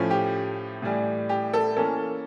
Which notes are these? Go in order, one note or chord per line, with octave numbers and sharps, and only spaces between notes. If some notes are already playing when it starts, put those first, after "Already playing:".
Already playing: A2 F3 A3 C#4
G4
A2 E3 G3
G4
A4
E3 A#3 C#4 A4